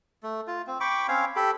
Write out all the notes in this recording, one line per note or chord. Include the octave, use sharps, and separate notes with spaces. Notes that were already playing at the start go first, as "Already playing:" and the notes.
A3
F4
C4
G5 B5 C#6 D6
C4 C#4 C#5 F5
G4 A4 B5